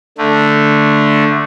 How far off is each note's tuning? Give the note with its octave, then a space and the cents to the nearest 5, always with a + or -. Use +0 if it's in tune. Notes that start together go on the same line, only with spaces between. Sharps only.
D3 +0 A3 +0